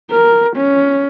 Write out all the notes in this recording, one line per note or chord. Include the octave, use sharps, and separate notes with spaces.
A#4
C#4